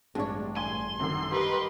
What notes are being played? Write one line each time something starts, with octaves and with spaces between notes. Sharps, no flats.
A1 G2 G#3 D4 C#5
G#5 C6
F#2 D3 D#3
G4 A#4 B4 D#5 A#5